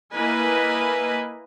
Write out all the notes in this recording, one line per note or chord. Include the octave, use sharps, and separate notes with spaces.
A#3 E4 B4 D#5 G#5